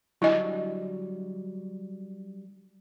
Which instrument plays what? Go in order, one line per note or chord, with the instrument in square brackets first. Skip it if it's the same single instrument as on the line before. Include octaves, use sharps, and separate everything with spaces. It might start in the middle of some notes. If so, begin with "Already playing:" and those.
[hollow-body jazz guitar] D3 F#3 G3 [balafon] E4 D#5